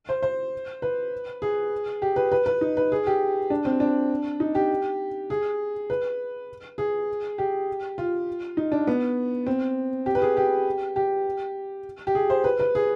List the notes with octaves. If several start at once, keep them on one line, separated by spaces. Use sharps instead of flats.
C5
C5
B4
G#4
G4
B4
B4
B4
D#4
B4
G#4
G4
D4
C4
D4
D#4
G4
G#4
B4
G#4
G4
F4
D#4
D4
B3
C4
G4
B4
G#4
G4
G4
G4
G#4
C5
B4
B4
G#4